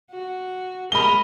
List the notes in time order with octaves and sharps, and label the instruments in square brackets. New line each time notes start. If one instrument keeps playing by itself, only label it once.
[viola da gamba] F#4
[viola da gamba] G#3 A#4 D#5 [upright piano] B5 G7